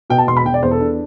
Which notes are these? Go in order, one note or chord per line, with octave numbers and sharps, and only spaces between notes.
B2 G5
A5
E1 C6
B5
E1 G5
D5
E2 C5
A4
D4